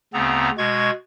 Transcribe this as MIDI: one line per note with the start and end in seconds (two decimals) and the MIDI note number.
0.14 0.50 38
0.14 0.50 49
0.14 0.50 59
0.14 0.50 60
0.14 0.50 82
0.58 0.91 47
0.58 0.91 56
0.58 0.91 85
0.58 0.91 92